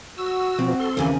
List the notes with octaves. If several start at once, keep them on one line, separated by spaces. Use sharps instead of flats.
F#4 E6
B2 F3 C4
A4 C6
D#2 C#3 E3 A#3 G#5